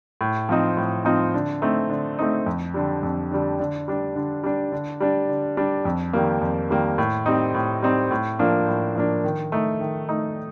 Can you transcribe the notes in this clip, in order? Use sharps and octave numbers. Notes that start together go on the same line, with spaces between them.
A2
F3 C4 D#4
A2
F3 C4 D#4
D3
A3 C4 D#4
D3
A3 C4 D#4
F2
D3 G3
F2
D3 G3
D3
G3 D4
D3
G3 D4
D3
G3 D4
D3
G3 D4
F2
D#3 G3 A#3
F2
D#3 G3 A#3
A2
G3 C4 D#4
A2
G3 C4 D#4
A2
F3 A#3 D4
A2
F3 A#3 D4
D#3
A3 D#4
D#3
A3 D#4